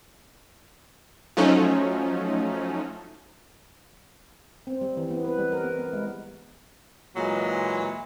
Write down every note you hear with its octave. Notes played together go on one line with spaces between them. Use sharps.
F3 F#3 A3 C#4 D#4
C4
G3
E3
B3
B4
G3
A#4
B3
B3
G#3
A#2 E3 F#3 G#3